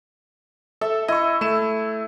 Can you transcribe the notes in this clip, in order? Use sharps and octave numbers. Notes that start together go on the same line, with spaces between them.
A4 E5
E4 D#5 C#6
A3 E7